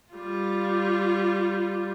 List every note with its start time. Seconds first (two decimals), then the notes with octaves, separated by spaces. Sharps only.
0.13 G3 F4